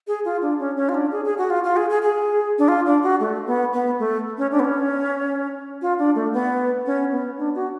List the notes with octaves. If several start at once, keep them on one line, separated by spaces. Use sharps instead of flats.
G#4
F4
D4
C#4
C#4
F4
D4
G#4
G#4
F#4
F4
F4
G#4
G#4
G#4
D4
F4
D4
F#4
A3
B3
B3
A3
C#4
D4
B3
C#4
F4
D4
A3
B3
C#4
B3
D4
F#4